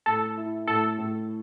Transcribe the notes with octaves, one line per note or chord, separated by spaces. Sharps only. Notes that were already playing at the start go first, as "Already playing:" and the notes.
A2 A4
E4
A2 A4
A2